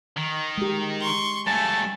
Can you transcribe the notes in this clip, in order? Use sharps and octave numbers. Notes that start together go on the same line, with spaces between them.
D#3
G#3 G4
C6 C#6
G2 A3 G#5 A5